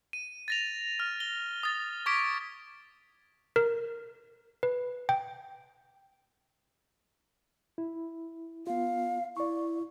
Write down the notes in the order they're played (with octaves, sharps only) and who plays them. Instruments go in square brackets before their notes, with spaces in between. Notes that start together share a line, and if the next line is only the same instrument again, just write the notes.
[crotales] D#7
A6 A#6 F7
F6
G7
D#6 A6
C#6 D6 G#6 B6 D7
[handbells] A#4
B4
G5
[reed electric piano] E4
[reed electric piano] B3 F4 [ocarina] F5
[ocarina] E4 [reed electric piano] D5 C#6